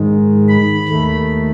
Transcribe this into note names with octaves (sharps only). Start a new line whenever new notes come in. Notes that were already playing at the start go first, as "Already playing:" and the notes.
Already playing: G#2 D#3 G#3
B5
D#2 D#3 A3